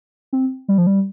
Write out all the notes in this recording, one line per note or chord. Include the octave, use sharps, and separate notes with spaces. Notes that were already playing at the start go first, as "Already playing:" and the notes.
C4
G3
F3
G3